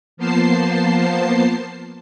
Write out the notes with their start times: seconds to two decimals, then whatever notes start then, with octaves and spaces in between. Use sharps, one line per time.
0.17 F3 A#3 B3 C5 A5 C7